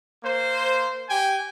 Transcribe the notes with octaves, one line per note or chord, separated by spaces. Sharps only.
A#3 C5
G4 G5 G#5